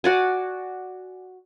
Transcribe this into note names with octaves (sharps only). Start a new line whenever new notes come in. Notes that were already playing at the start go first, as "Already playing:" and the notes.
F#4 D5 G#5